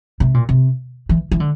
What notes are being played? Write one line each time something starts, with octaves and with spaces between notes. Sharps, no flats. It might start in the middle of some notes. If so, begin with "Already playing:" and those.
C3
A#2
C3
E3
E3
D3